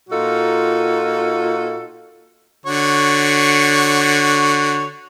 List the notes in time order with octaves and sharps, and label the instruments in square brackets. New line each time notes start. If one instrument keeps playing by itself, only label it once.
[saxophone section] A#2 D#4 F4 F#4 A4
[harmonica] D3 F#4 C#5